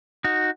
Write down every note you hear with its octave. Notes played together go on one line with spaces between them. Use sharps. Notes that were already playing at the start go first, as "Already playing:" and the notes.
D#4 F#4